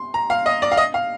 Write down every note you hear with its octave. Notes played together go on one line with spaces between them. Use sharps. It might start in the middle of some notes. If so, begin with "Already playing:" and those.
Already playing: C6
A#5
F5
D#5
D5
F5
D#5
F5